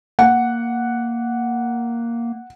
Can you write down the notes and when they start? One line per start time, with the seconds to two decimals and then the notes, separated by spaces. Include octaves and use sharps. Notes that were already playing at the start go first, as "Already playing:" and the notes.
0.19 A#3 F#5